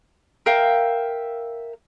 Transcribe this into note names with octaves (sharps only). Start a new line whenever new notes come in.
A#4 E5 F5 G5